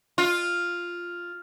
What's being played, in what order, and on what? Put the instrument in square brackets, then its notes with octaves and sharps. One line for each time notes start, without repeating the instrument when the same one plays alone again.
[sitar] F4